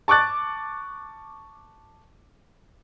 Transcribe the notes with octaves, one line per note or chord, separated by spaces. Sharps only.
A5 C#6 D6 F#6 A6